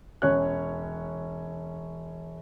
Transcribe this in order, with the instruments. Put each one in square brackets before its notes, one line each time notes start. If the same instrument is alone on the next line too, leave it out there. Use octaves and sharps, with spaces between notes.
[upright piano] E1 C#4 C#5 F#6